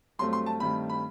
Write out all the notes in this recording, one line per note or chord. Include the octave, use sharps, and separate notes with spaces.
G2 F#3 A3 C4 C6
C6
A5
G2 D#3 A3 C4 B5
B5